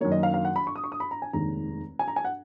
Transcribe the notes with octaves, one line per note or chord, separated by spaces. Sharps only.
F#2 D#3 A#3 C#5
D#5
F5
F5
F#5
B5
C#6
D#6
C#6
D#6
B5
A#5
G#5
F1 D#2 D#3 G#3 A#5
G#5
A#5
G#5
F#5